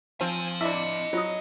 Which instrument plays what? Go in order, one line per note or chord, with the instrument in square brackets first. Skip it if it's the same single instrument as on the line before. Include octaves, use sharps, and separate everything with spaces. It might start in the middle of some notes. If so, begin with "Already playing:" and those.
[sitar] F3 C4 [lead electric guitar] G#5
[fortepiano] D4 E5 [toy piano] E4 D6 [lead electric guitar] D#5 B5
[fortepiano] F#3 D#6 [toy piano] F4